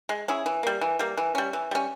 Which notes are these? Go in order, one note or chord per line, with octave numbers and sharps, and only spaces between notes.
G#3
C#4 E4 G#4
E3
G3 A#3
E3
G3 A#3
E3
G3 C#4
E3
G3 C#4